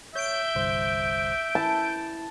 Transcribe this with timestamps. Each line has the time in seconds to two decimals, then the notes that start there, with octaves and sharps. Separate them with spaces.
0.15 C#5 E5 G6 D7
0.55 G1 C2 C5
1.55 E4 A5